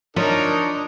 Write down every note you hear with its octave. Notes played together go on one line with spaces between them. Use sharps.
F3 D4 D#4 A#4 C#5